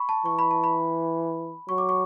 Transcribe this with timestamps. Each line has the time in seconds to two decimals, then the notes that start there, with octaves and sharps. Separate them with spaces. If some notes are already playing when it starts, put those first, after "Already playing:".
Already playing: B5 C#6
0.09 A5
0.26 E3 C#6
0.39 B5
0.51 A5
0.64 B5
1.69 F#3 C#6
1.78 D6
1.89 C#6